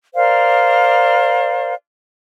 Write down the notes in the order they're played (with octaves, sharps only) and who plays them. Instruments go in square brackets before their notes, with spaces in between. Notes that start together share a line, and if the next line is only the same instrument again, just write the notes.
[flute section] A#4 C5 D5 F5